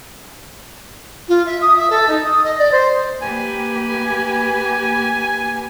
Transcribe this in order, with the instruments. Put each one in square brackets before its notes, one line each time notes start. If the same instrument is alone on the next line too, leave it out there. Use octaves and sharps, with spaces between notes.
[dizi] F4
E5
D#6
E5
A4
D#4
D#6
D#5
D5
C5
[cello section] A#3 G4 B4 [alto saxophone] G#5